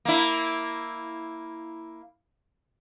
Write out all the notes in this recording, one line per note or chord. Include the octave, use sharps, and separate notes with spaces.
A#3 E4